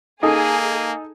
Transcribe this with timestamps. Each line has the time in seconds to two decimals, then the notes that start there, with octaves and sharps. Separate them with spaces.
0.23 A#3 D#4 G#4 A4